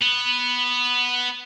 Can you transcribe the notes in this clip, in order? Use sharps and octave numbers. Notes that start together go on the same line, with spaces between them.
B3